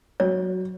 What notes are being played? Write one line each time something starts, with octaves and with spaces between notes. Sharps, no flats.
F#3 C#5